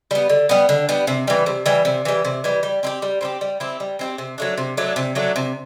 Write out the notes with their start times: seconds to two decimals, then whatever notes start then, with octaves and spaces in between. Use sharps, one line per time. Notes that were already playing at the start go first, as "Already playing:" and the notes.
0.11 G3 B3
0.30 D3
0.49 G3 B3
0.69 D3
0.89 G3 B3
1.07 C3
1.27 E3 G3
1.46 C3
1.66 E3 G3
1.85 C3
2.05 E3 G3
2.25 C3
2.44 E3 G3
2.63 G3
2.83 C4 E4 G4
3.02 G3
3.21 C4 E4 G4
3.41 G3
3.60 C4 E4 G4
3.80 G3
3.99 C4 E4 G4
4.18 C3
4.38 F#3 A3 D4
4.58 C3
4.77 F#3 A3 D4
4.96 C3
5.15 F#3 A3 D4
5.36 C3